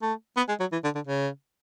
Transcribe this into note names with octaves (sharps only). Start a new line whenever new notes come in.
A3
B3
G#3
F#3
E3
D3
D3
C#3